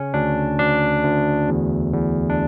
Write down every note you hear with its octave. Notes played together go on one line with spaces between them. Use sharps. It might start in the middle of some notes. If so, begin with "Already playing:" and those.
Already playing: C#3 C#4
D2 D4
D2 D4
D2
E2
E2
D4